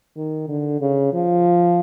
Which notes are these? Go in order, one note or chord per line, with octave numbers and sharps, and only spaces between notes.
D#3
D3
C#3
F3